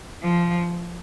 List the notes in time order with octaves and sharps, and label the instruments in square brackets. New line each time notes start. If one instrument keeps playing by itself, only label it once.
[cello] F3